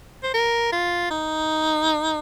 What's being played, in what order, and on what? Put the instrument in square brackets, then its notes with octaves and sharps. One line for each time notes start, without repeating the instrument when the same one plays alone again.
[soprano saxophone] C5
A#4
F4
D#4